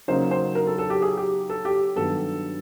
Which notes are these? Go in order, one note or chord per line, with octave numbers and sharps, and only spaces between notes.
C#3 F#3 A#3 D#4 C5
C5
A#4
A4
A4
G4
G#4
G4
A4
G4
G2 D#3 F#3 B3 A4